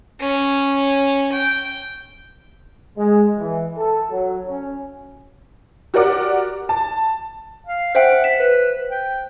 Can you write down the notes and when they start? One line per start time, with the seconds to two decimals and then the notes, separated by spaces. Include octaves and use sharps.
0.21 C#4
1.32 G5
2.98 G#3
3.38 E3
3.78 A4
4.11 F#3
4.46 C#4
5.94 F#4 G4 A#4 D5 F#5 D6
6.69 A5
7.67 F5
7.95 C5 E5 F#5 G5
8.24 B6 E7
8.39 B4
8.91 G5